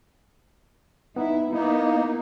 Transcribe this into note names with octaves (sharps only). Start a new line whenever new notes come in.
B3 D#4 E4
A#3 B3 D#4 E4